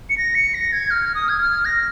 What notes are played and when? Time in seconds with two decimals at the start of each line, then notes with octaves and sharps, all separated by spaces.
0.09 C#7
0.18 A#6
0.35 C#7
0.54 A#6
0.72 G#6
0.90 F6
1.15 D#6
1.29 G#6
1.40 F6
1.65 A#6